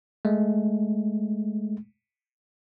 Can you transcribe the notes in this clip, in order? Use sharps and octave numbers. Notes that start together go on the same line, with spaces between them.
G#3 A3